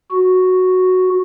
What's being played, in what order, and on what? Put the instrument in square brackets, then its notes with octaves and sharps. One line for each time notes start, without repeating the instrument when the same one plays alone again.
[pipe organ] F#4